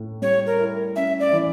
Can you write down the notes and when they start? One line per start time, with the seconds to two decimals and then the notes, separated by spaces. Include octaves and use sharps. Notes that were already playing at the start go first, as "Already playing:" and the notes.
Already playing: A2
0.22 G3 C#5
0.46 A#4
0.59 E4
0.96 C#4 E5
1.20 D5
1.33 E3